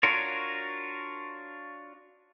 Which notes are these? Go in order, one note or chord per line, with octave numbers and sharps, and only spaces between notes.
D4 F4 F#4 A#4 C#5